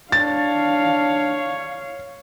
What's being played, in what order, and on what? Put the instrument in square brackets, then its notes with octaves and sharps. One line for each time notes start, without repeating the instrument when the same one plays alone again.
[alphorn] D4 [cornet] C#5 [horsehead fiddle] F5 [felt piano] A6